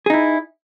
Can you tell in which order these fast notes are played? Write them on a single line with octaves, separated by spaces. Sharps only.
G#4 D#4 E4